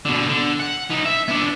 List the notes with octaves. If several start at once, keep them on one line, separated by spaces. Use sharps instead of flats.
B2 D3
D3
F#5
B3 D#4
E5
B3 D4